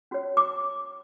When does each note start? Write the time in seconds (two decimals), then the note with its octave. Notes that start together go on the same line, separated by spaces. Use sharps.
0.11 C#4 F#4 C#5
0.37 D6